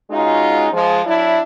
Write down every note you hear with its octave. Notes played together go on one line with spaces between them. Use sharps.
G#3 C#4 D#4 F4 F#4
F3 G#3
F#3 D4 E4